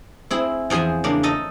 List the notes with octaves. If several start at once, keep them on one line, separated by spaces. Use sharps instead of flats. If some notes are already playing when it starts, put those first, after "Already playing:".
C4 E4 G#4
E2 F3 G#4 C5 G#5
C#3 A#3 D4
D#4 A4 D#5